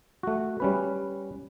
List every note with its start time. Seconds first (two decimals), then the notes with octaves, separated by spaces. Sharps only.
0.23 A3 F#4
0.60 G3 C#4 B4